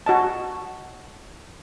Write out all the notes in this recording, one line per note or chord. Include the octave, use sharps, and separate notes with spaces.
F#4 D#5 A5